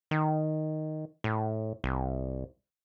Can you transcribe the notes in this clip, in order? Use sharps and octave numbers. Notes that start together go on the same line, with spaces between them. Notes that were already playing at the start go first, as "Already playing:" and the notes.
D#3
A2
C2